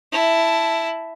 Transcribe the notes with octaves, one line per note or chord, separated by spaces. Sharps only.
E4 A5